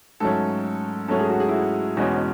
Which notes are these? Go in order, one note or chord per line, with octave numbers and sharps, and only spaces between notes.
G#2 F#3 A3 C#4 A4
G#2 F#3 A3 C#4 A4
G#4
F#4
G#4
E4
F#4
E2 B2 G#3 C#4 F#4
C#4